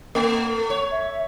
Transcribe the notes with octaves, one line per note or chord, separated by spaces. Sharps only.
A3
C#5
E5